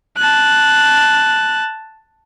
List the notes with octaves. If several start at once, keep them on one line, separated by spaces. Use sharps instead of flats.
A5 F#6